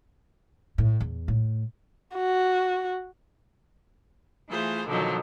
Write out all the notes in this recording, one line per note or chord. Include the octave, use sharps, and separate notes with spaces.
A2
E2
A2
F#4
E3 A3 F4 G#4 C5
B2 D3 D#3 F3 F#3